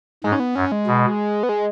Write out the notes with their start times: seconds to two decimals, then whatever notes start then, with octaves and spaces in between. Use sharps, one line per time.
0.24 G#2 G#3
0.32 C#4
0.40 B3
0.55 F#2 C#4
0.72 G#3
0.87 B2
1.43 B3
1.49 G#3